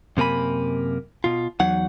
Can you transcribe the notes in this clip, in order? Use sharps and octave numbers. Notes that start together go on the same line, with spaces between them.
F#2 C3 A#3 G#5 B5
B2 F4
E2 F#3 D#4 F#5